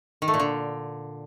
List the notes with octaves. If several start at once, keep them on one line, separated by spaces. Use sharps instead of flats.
D#3
A3
A#2
D3